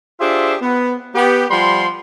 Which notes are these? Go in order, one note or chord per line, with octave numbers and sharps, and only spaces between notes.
D4 F4 G4 G#4 C5 E5
B3
B3 G4
F3 G3 F#5 B5 C6